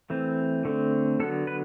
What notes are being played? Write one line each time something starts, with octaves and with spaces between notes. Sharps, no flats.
E3 A3 C4
D3 A3 C4
D3 F#3 B3 A4
B4